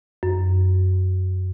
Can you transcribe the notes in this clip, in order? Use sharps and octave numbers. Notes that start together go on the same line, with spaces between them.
F#2